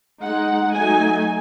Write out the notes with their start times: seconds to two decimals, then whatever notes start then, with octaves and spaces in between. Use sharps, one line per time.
0.22 G#3 D#4 F#5
0.74 F#3 A3 D#4 G#5